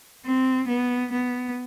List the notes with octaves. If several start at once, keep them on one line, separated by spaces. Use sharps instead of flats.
C4
B3
B3